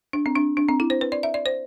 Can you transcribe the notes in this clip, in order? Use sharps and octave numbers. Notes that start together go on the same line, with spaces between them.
D4
C4
D4
D4
C4
E4
C5
B4
D5
E5
D5
C5